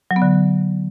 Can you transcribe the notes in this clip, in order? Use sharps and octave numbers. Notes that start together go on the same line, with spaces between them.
F#3
B3
D3